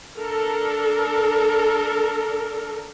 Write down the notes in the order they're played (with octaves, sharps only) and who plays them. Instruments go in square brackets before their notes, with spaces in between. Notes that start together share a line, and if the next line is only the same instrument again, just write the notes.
[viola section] D4 A4 A#4